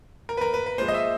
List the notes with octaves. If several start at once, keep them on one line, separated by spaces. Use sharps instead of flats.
A#4
B4
A#4
B4
B4
A#2 F3 G#3 C5
D#5
E5